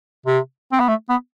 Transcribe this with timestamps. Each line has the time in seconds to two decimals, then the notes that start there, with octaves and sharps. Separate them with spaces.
0.26 C3
0.72 C4
0.80 B3
0.88 A3
1.09 B3